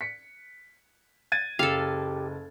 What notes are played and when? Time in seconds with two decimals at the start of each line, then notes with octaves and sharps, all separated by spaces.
0.01 B6 C#7
1.32 G#6 A6 D#7
1.59 F#1 G4 A4 F5